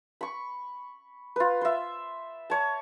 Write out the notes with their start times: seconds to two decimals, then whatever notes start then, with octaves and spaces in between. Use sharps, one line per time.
0.21 B5 C#6
1.36 F4 B4
1.61 C5 E5
2.50 C#5 A5